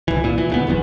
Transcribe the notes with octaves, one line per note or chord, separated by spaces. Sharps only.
C2 E3
A#2
E3
D2 F#3 B3
F1 B1 E2 E3